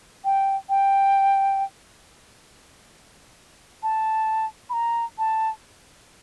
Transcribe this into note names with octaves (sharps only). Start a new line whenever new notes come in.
G5
G5
A5
B5
A#5
A5